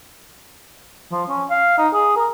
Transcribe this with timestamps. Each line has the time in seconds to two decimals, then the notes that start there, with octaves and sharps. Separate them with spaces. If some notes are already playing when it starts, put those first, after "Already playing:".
1.11 F3
1.29 C#4
1.50 F5
1.78 D#4
1.93 G#4
2.16 A#4